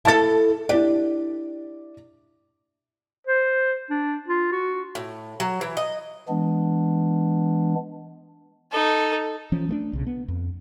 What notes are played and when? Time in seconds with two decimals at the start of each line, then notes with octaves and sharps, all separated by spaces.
0.05 E4 A4 A5 A6
0.69 D4 E4 G4 D5
3.27 C5
3.90 D4
4.28 F4
4.52 F#4
4.95 A2
5.40 F#3
5.61 E3
5.77 D#5
6.28 E3 G#3 B3 D4
8.71 D#4 A4
9.52 E3 F3 C#4
9.69 A3 A#3 D4
9.93 B1 C#3
10.06 B3
10.28 F2